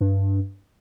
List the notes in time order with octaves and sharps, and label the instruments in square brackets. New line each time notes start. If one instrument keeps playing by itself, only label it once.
[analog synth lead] G2